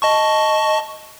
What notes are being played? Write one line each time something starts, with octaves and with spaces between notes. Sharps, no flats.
D#5 A5 C#6